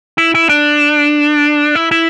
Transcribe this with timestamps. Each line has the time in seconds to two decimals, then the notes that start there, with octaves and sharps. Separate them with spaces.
0.18 E4
0.35 E4
0.49 D4
1.75 E4
1.91 E4